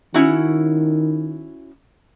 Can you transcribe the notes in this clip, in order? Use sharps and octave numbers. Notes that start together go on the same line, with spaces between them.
D#3 C#4 E4 F#4